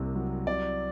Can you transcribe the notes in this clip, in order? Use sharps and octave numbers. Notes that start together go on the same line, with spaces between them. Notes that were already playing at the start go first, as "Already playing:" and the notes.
Already playing: C2 C3 A#3
F#3
C3 D5